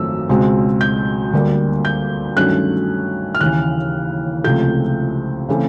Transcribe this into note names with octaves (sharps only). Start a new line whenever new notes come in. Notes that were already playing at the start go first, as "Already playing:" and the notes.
Already playing: G#1 F#2 F3 A3 E6
C#2 B2 G#3 C4
G6
D2 D3 G3 A#3
G6
G2 D#3 F#3 A3 C#4 F#6
F6
D#2 C#3 E3 F#6
C#2 C3 F3 A3 G6
C#3 E3 A3 C4